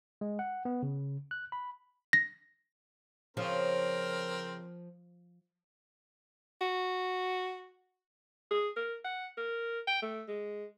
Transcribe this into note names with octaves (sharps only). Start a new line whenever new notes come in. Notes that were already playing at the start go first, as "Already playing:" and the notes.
G#3
F#5
B3
C#3
F#6
B5
A#6
C#3 F3 C4 A#4 C#5 F5
F#4
G#4
A#4
F#5
A#4
G5
A3
G#3